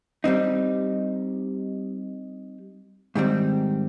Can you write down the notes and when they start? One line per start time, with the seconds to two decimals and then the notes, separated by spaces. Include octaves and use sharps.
0.24 G3 C4 D#4
3.15 G#2 D#3 G3 C4